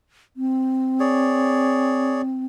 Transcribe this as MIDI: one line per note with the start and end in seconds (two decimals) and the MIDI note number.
0.37 2.46 60
1.00 2.22 68
1.00 2.22 73
1.00 2.22 74